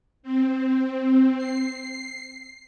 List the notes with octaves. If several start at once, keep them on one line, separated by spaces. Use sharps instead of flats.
C4
C7